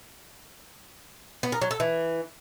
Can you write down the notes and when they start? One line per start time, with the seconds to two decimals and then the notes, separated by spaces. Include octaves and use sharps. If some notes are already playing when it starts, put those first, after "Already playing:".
1.43 B3
1.52 A#4
1.62 F#3
1.71 A4
1.80 E3